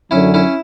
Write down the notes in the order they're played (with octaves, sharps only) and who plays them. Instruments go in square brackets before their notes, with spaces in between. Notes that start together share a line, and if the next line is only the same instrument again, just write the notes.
[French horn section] F#2 D3 F#3 [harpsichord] C#4 E4
[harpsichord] C#4 E4